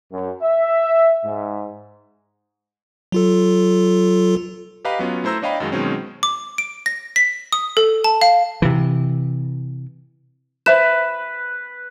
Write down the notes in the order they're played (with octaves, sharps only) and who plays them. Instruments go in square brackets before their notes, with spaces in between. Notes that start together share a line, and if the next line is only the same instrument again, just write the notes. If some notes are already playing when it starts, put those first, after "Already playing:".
[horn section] F#2
E5
G#2
[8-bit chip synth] F#3 F4 A4
[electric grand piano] G4 B4 D#5 F5 A#5 B5
F#3 B3 C#4 F4
A3 E4 C5 A#5 E6 A#6
D4 C#5 D#5 F5 G5 B5
F#2 D#3 F#3 G#3
B2 D#3 F#3 G#3 C4 C#4
[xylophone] D6
D7
A#6
B6
D#6
A4
A5
F5
[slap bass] C3 E3
[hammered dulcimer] B4 [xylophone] C5 E5 E7